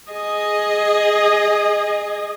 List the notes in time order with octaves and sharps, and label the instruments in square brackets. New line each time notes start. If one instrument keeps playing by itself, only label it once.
[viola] G#4 D#5